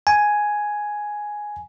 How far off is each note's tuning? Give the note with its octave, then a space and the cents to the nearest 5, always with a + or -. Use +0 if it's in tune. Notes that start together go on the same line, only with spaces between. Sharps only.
G#5 +5